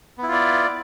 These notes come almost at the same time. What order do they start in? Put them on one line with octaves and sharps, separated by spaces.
B3 E4 F4 D5